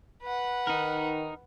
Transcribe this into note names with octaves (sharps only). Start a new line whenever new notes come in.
B4 F#5
D#3 D#4 A#4